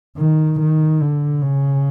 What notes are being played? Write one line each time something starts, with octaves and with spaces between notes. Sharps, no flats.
D#3
D#3
D3
C#3